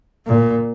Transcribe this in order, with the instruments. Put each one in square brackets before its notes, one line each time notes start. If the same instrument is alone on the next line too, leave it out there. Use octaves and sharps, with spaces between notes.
[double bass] A#2